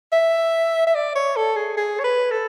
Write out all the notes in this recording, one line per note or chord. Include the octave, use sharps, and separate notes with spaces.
E5
E5
D5
C#5
A4
G#4
G#4
C#5
B4
A4